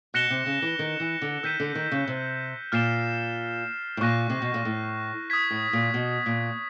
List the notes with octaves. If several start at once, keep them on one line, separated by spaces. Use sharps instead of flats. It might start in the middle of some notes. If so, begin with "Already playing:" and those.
B2 F#6 A#6 C#7 E7 G7
C3
C#3
E3
D#3
E3
D3
D#3 E6 G6 B6 D#7
D3
D#3
C#3
C3
A#2 F6 A6 C7 E7 G7
A2
A#2 C#6 F#6 A#6 D#7
C3
B2
A#2
A2
D#6 G#6 B6
A2
A#2
B2
A#2